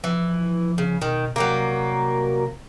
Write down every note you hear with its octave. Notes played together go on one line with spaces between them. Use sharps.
E3 F3
C#3
B2 D#3
C3 F#3 G3 A#3